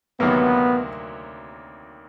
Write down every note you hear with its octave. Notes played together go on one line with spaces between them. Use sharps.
D2 C3 D#3 F#3 A#3 B3